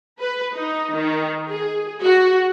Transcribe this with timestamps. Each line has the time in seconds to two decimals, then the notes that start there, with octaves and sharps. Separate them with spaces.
0.20 B4
0.54 D#4
0.94 D#3
1.48 G#4
2.03 F#4